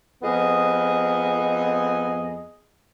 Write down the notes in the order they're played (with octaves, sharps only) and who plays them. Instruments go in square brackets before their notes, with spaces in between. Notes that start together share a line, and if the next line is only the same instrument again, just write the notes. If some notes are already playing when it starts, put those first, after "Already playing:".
[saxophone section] F2 B3 G#4 D#5